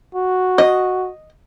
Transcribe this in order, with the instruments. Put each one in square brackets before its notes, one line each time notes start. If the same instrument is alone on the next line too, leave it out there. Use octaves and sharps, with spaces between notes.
[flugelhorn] F#4
[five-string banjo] D#5